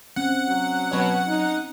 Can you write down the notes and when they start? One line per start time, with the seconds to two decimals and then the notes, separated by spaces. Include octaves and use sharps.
0.16 C4 C#4 F#5
0.48 F#3
0.91 B2 F#3 C#5
1.28 D#4